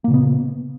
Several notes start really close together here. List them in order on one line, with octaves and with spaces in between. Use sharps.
A#3 A#2 C#3 B3